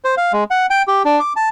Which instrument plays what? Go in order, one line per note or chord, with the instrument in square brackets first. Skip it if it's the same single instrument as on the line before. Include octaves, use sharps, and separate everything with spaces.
[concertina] C5
F5
G#3
F#5
G5
G4
D4
D6
A5